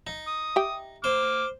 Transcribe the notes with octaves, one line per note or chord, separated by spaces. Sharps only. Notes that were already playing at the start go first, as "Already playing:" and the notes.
D#4
D#6
G4 E5 G5
C5 D6 F6